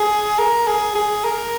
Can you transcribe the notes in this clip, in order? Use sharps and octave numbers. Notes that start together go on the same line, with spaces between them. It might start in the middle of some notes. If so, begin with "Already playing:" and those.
Already playing: G#4
A#4
G#4
G#4
A#4